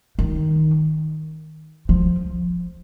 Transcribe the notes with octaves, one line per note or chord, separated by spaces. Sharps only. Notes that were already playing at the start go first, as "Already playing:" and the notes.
D#3
F3